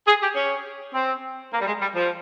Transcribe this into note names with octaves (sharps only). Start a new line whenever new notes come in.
G#4
G4
C#4
C4
A#3
G3
G#3
G3
F3